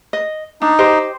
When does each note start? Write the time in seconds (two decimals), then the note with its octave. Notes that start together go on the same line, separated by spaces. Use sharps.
0.13 D#5
0.62 D4 D#4
0.79 G4 C5 D#5